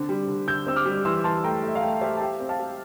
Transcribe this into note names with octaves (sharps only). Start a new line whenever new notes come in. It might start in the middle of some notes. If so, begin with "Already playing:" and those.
Already playing: D3 C4
G3
D3
D3 E6 G6
C4 E6
D6 F6
G3
E3 C6 E6
E3 A5 C6
A3 G5 A#5
A3 E5
F5
A3 E5 G5
G4 C5 E5
A5
G4 E5 G5
C4
F5 A5
G4